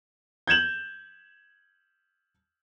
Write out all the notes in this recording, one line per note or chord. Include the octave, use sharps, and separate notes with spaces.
G6 G#6 E7 F#7